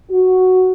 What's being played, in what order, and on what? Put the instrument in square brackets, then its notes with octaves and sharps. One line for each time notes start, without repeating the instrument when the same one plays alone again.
[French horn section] F#4